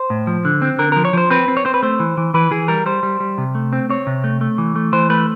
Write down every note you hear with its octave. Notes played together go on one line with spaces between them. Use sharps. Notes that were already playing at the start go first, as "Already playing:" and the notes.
Already playing: C5
A2
F3
D3
C4
D3 A#4
F3 A#4
C#5
F3 C5
C4 B4
C4
C#5
C4 C5
B4
A3 C5
E3
E3
E3 B4
E3 G#4
G3 A#4
G3 C5
G3
G3
C3
A3
C4
C4 C#5
C3
A3
A3
E3
A3
E3 C5
A3 B4